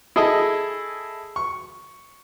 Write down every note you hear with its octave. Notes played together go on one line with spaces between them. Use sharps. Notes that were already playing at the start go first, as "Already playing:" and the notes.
E4 G#4 A4 D#5
C#6